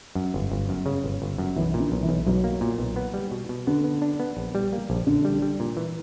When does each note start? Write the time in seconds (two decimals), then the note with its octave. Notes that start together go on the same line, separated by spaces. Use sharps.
0.15 F#2
0.34 G1
0.51 G1
0.69 F#2
0.86 C#3
1.04 G1
1.22 G1
1.38 F#2
1.56 B1 E3
1.74 A#2
1.80 D3
1.92 B1
2.02 E3
2.09 B1
2.27 B1 F#3
2.44 A#3
2.61 A#2
2.78 B1
2.96 B3
3.14 G3
3.31 B2
3.49 B2
3.67 D3 B3
3.84 B3
4.02 D4
4.20 B3
4.37 A#1
4.55 G3
4.73 A#3
4.90 A#1
5.07 A#1 D3
5.25 G3
5.42 G3
5.60 A#2
5.77 E3